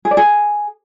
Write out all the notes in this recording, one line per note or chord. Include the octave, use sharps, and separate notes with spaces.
G#4
D5
G#4